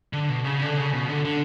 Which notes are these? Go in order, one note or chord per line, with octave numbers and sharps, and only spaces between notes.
D3
B2
C#3
D3
C#3
B2
D3
D3